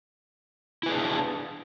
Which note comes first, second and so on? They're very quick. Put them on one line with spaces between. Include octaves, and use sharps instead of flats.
E4 B4 G#4 D4